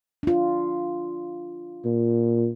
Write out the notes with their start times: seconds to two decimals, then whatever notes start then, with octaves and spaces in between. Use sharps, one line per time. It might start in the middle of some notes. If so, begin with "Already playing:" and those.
0.23 D4 F4
1.85 A#2